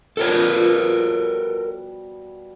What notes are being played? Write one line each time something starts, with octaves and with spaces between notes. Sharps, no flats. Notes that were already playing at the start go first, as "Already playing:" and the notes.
B2 F3 G3 A4 A#4 C#5